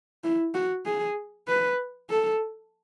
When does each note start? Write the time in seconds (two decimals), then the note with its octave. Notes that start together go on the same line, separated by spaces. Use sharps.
0.24 E4
0.54 F#4
0.86 G#4
1.48 B4
2.10 A4